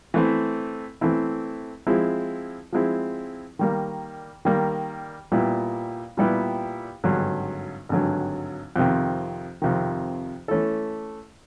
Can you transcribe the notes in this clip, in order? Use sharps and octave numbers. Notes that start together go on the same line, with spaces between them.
E3 A3 C4 E4
E3 A3 C4 E4
F3 G#3 C4 E4
F3 G#3 C4 E4
D#3 G3 A#3
D#3 G3 A#3
A#2 G3 B3 E4 G4
A#2 G3 B3 E4 G4
G#1 G2 D3 F#3
G#1 G2 D3 F#3
F2 C3 D#3
F2 C3 D#3
E3 A3 C#4 E4 A4